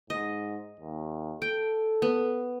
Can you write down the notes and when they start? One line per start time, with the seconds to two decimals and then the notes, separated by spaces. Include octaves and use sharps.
0.10 G#2 D#5
0.80 D#2
1.42 A4 G5
2.02 B3